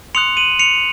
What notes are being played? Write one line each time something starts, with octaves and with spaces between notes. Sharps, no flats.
C6 D#6 F#6 C#7 F7
D#7 F#7
C#7 F7